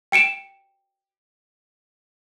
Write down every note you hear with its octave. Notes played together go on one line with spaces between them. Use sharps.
G5 C#7 D7 E7